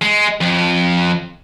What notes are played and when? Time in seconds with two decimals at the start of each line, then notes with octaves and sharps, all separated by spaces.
0.02 G#3
0.41 F2